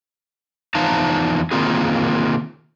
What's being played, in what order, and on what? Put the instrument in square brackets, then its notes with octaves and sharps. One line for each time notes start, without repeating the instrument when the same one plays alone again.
[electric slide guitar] E2 F3 D#4 F5 A5 A#5
D#3 A#3 C4 F4 G#4